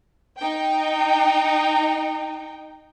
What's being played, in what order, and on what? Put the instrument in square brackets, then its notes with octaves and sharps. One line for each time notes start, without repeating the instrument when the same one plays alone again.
[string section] D#4 G5